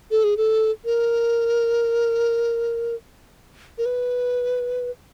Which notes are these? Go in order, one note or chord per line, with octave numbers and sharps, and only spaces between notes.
A4
G#4
A4
A#4
A#4
B4